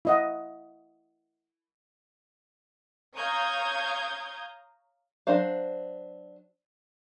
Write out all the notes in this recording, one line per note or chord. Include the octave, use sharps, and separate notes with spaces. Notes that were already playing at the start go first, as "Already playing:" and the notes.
E4 D#5 F#5
C#5 F5 A#5 D#6 G6 G#6
F#3 D4 C5 F5